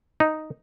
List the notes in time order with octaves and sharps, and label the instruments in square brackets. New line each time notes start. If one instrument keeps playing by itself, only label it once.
[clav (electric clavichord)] D#4